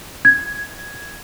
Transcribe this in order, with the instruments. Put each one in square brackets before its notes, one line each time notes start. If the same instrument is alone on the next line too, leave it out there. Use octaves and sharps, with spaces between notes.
[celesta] G#6